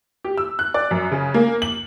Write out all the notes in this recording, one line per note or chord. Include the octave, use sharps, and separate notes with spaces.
G4
E6
F#6
D5
F#2
C#3
A#3
F#7